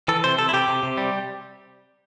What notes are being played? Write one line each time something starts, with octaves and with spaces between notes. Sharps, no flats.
E3 A4
C3 C5
C3 A4
E4
C3 G4
C3
C3
G3